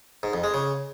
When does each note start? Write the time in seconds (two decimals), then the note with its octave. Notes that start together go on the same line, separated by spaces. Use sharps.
0.23 G#2
0.33 F2
0.44 G#3
0.54 C#3